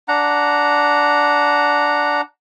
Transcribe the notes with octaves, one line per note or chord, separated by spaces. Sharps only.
D4 F#5 A#5